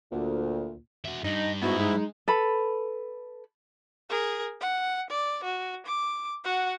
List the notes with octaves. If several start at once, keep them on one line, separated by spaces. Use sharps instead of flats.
D2 A#2
F#4 E5
G2 D#4 D#5
G#2 B3 E4 F#4
G#3 D#4
A4 B4 B5
G#4 A#4
F#5
D5
F#4
D6
F#4 F#5